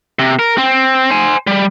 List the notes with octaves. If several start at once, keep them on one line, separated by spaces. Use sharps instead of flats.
C3
A#4
C4
C5 G#5
G3